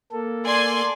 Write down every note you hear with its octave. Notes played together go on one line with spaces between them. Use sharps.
A#3 A4
D5 G#5 C6